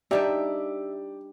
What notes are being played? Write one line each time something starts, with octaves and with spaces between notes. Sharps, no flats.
G3 D4 D#4 G4 D5 E5